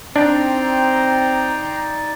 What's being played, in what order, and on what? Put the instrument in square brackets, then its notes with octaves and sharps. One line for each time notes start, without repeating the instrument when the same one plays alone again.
[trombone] C4 [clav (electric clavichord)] D4 [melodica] D#4 D5 [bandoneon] G5 A#5 C6